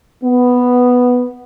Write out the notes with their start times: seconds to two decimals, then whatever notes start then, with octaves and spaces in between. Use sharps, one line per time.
0.24 B3